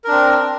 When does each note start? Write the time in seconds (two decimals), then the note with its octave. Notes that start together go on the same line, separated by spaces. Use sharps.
0.04 A#4
0.08 D4
0.11 C4